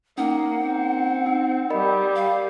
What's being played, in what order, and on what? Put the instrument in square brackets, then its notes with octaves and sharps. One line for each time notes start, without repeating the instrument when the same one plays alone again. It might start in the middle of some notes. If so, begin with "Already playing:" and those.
[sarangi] A#3 [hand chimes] C#4 D#4 [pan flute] F#5
[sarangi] C4
[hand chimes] D#4
[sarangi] G3 [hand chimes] A#4 D#5 B5
[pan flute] F5